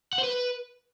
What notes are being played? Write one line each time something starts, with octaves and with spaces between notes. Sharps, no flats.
F#5
C5
B4